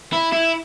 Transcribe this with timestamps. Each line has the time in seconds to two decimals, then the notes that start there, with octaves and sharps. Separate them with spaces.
0.13 E4
0.33 E4